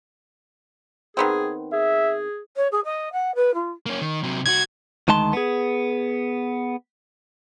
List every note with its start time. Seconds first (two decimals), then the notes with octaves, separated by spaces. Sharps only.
1.17 D#3 B3 C4 G#4
1.73 G#4 E5
2.57 C#5
2.72 G#4
2.85 D#5
3.13 F#5
3.35 B4
3.54 F4
3.86 A#3 C#4
4.01 D#3
4.23 C3 F#3
4.46 C2 F#4 G#6
5.08 D2 D#3 G#3 A5 C6
5.33 B3 G#4